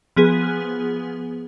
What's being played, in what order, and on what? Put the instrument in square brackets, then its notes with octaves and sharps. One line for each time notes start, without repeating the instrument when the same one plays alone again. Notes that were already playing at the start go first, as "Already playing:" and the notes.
[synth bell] F3 B3 G#4